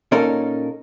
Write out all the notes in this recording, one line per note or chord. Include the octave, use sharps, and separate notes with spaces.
A#2 C#4 D#4 A4 A#4